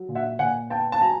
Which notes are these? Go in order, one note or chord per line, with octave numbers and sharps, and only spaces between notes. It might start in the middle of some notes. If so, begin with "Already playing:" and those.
Already playing: F#3
A#2
E5 F#5
A#2 F#5 G#5
B3 G5 A5
A5
F#3 G#5 A#5